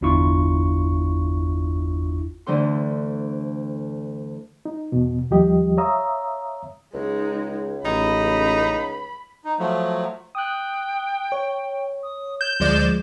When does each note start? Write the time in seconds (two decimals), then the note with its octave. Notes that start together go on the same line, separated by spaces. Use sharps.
0.01 G1 E2 D4 E4 F4 C#6
2.46 D2 D3 E3 C5 C6
4.65 D#4
4.92 E2 B2
5.31 D#2 F3 G3 G4 D#5
5.77 C#5 E5 F5 A#5 D#6 E6
6.94 C#2 G#3 D#4
7.85 A1 D#4 B5
9.45 D#4
9.59 F3 F#3 A3
10.35 G5 D#6 F#6
11.32 C#5
12.03 D#6
12.41 G6 E7
12.60 D2 F3 G#3 D5